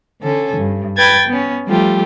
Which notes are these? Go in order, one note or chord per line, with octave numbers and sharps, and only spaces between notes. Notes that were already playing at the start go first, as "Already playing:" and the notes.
D3 C#4 A4
G2
B4 G5 G#6 A6
B3 C#4
F3 G3 A3 F4 G4